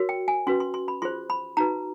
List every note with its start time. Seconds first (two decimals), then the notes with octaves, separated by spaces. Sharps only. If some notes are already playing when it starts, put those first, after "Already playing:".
Already playing: F#4 A#4 C#5
0.09 G5
0.28 G#5
0.47 C#4 F#4 B4 C6
0.60 C6
0.74 C6
0.88 B5
1.02 F4 G#4 C5 C6
1.30 B5
1.57 D#4 F#4 B4 A#5